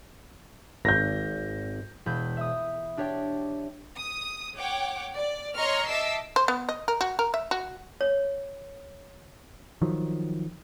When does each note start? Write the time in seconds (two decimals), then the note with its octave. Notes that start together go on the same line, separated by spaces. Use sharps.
0.85 G#1 G6 A#6
2.06 E1 B5 G6 G#6
2.37 E5 D#6
2.97 D4 G4 C#5 D5 G5
3.96 D#6
4.58 C#5 F#5 G5 D6
5.14 D5
5.56 C#5 D#5 A#5 C6 C#6 F6
5.87 D#5 E5 A5 D6 E6 C7
6.36 C5
6.48 B3
6.69 D#5
6.88 A#4
7.01 F#4
7.19 A#4
7.34 E5
7.51 F#4
8.01 C#5
9.82 D#3 F3 F#3